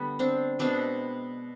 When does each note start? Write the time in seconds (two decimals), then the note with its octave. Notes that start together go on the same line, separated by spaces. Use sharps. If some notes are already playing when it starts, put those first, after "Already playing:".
Already playing: D3 G3 B3
0.19 C4 D4
0.59 B2 G#3 B3 C4 D4